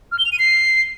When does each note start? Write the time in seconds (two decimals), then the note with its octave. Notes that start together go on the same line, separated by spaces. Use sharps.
0.12 F6
0.18 G7
0.25 F7
0.32 D#7
0.39 C7